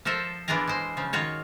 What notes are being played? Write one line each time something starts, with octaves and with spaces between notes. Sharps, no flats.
F3 A4 A#4 C5 E5
E3 B3 D4 F4 G#4 A#4
G#3 C5
C#3 F3
D#3 F4 F#4 C#5